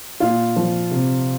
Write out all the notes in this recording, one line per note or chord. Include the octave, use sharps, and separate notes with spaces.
A#2 F4
F3
C3